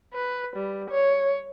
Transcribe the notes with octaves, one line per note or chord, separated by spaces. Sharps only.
B4
G3
C#5